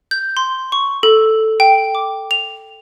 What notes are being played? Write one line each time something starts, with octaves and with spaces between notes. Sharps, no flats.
G6
C6
C#6
A4
G5
D6
F7